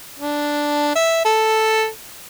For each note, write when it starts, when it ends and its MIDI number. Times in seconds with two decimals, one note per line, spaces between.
0.19 0.91 62
0.96 1.22 76
1.25 1.87 69